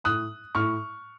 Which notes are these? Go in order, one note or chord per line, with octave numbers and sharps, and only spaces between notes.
A2 D#6 F#6
A2 C#6 F6